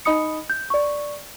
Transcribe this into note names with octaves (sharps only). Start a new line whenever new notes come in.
D#4 D#5 B5 D#6 C#7
G6
D5 C#6